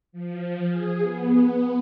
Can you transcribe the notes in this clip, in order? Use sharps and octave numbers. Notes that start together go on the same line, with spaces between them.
F3
G#4
B3